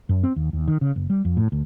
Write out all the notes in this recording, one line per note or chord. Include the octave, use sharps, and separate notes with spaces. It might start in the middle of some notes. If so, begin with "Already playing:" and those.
F#2
C4
D#2
D#2
D#3
C#3
F#1
G3
F2
A2
D2